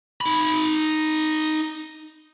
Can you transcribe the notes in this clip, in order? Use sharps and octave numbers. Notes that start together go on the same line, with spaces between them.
D#4 B5